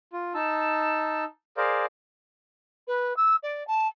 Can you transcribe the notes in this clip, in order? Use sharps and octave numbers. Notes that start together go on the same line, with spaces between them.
F4
D#4 A5 E6
G#4 A#4 C5 D5 F5
B4
E6
D5
A5